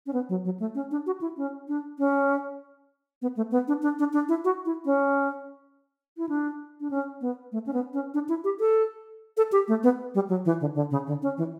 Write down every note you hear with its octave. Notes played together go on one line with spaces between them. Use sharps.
C#4
B3
F#3
F#3
A3
C#4
D4
F#4
E4
C#4
D4
C#4
B3
A3
B3
D4
D4
D4
D4
E4
F#4
E4
C#4
E4
D4
D4
C#4
B3
A3
C#4
B3
C#4
D4
E4
G4
A4
A4
G4
A3
B3
G3
F#3
E3
D3
D3
C#3
D3
C#4
E3